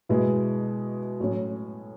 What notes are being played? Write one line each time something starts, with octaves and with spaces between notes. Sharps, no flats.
B2 G#3 B3 E4
A2 F#3 C#4